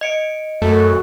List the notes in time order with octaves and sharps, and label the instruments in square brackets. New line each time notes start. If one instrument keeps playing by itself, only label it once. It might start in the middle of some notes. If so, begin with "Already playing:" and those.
[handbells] D#5 C#7 D7
[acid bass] F#2 [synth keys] A3 [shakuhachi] F#4